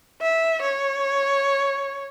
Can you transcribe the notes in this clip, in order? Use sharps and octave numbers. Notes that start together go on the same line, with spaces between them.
E5
C#5